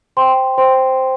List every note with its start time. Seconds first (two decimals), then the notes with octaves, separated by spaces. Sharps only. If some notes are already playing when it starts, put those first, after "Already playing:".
0.17 C5 G5 C6
0.58 C5 G5 C6